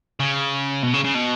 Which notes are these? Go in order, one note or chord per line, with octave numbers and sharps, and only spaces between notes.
C#3
B2
C#3
C#3
B2